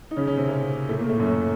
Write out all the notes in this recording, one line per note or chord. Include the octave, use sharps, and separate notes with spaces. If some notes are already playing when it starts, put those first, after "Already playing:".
D#4
C#3 C#4
C#3 C#4
C3 C4
A#2 A#3
A2 A3
A#2 A#3
A2 A3
F#2 F#3